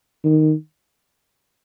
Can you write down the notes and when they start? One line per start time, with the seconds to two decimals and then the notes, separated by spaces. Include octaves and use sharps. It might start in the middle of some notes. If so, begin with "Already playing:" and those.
0.24 D#3